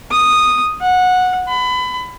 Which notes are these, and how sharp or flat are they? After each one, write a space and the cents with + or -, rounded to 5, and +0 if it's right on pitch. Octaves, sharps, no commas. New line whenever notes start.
D#6 -5
F#5 -15
B5 +25